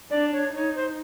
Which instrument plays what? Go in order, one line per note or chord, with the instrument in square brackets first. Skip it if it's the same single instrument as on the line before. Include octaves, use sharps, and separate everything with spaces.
[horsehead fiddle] D4 [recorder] D5
[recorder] C#5
[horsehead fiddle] D#4 [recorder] C#5
[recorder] C5